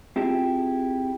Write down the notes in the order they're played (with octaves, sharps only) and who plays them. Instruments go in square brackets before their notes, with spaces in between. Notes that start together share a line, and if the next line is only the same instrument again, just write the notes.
[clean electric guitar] C4 E4 F4 G4 G#4 A5